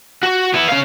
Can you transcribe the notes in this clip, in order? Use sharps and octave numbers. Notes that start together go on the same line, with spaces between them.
F#4
B3 E4
C#4 F5